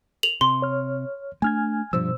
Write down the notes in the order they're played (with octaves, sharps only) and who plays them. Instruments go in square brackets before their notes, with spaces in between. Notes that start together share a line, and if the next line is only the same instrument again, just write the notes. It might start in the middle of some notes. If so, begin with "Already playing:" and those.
[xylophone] F7 F#7
[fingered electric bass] C3 [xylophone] C6
[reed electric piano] C#5 F6
[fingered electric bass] A3 D4 [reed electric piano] G#5 F6 G#6
[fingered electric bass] G2 F3 [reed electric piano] B2 C5 E6